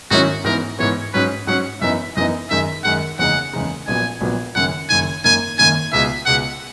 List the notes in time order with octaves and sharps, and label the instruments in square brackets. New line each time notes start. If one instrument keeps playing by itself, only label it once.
[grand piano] G#2 D#3 F#3 C#4 E4 [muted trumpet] F#4
[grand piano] G#2 E3 B3 [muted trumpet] A#4
[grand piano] G#2 E3 B3 [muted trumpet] C#5
[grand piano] G#2 F#3 C#4 [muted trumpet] B4
[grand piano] G#2 F#3 C#4 [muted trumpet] F#5
[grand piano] F#2 E3 B3 D#4 [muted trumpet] E5
[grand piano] F#2 E3 B3 D#4 [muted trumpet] D#5
[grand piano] F#2 D#3 G#3 D#4 [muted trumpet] E5
[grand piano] F#2 D#3 G#3 D#4 [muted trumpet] F#5
[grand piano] F#1 E2 C#3 G#3 D#4 [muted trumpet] F#5
[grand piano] F#1 E2 C#3 G#3 D#4
[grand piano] A#1 A#2 F#3 B3 [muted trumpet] G#5
[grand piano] A#1 A#2 F#3 B3
[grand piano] F#1 F#2 D#3 [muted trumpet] F#5
[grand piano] F#1 F#2 D#3 [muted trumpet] G#5
[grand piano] G#1 F#2 D#3 A#3 [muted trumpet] G#5
[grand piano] G#1 F#2 D#3 A#3 [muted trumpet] G#5
[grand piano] C#2 B2 G#3 [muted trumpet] E5
[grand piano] C#2 B2 G#3 [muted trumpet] F#5